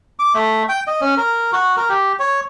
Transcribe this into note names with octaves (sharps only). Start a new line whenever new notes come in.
D6
A3
G5
D#5
C#4
A#4
F#4
A#4
G4
C#5